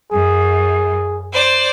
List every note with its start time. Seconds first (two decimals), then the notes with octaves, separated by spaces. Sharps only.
0.12 F#2 G#4
1.33 C5 D5